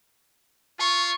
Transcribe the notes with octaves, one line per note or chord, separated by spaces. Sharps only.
F4 C#6